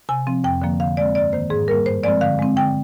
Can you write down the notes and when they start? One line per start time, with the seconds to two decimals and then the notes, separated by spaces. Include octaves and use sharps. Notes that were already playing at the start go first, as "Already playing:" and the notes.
0.09 C3 G#5
0.27 F3 C4
0.44 F2 G5
0.62 D3 F3 A#3
0.80 D3 F5
0.97 G#3 C4 D5
1.15 G2 D5
1.33 D#3 A#3 C5
1.50 G#2 G#4
1.68 G3 A#3 A#4
1.86 G2 C5
2.03 F3 G#3 C4 D5
2.21 D3 F5
2.39 G#3 C4
2.56 D3 G5